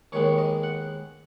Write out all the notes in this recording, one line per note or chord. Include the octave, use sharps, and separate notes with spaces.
D#2 D#3 G#3 B3 C#5
D#5
F#5